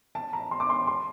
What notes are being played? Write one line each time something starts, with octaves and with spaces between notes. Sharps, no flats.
A5
A#5
C6
D6
C6
C6